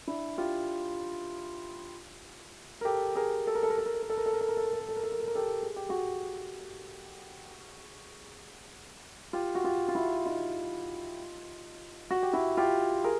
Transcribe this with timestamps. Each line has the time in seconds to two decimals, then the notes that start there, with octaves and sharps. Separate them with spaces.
0.08 D4 E4
0.38 F4 G4
2.81 A#4
2.85 G4 A4
3.15 G#4 A#4
3.47 A4
3.55 A#4
3.63 A4
3.70 A#4
3.78 A4
3.86 A#4
3.94 A4
4.02 A#4
4.10 A4
4.17 A#4
4.26 A4
4.33 A#4
4.41 A4
4.49 A#4
4.57 A4
4.65 A#4
4.73 A4
4.81 A#4
4.89 A4
4.97 A#4
5.04 A4
5.12 A#4
5.20 A4
5.28 A#4
5.35 G4 A4
5.63 G#4
5.76 G4
5.89 F#4 G#4
9.33 F4 G4
9.55 F#4
9.64 F4 G4
9.89 F4
9.95 E4 F#4
10.25 D#4 F4
12.11 F#4
12.23 G4
12.33 E4 F#4
12.57 F4 G4
13.04 G#4 A#4